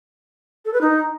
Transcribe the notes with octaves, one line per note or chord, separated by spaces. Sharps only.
A4
B4
D#4